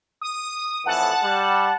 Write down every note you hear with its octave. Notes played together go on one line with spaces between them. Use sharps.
D#6
F2 A2 E3 F#5 A5 F#6
G3